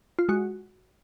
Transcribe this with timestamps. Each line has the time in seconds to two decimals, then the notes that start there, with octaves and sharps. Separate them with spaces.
0.19 F4
0.29 G#3 F#4